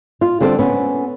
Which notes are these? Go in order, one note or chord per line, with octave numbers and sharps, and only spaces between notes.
F4
D3 G3 C4 A4
B3 C#4